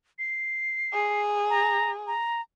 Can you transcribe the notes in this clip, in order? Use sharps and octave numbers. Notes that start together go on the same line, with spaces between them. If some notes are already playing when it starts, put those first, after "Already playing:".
C7
G#4
A#5
A#5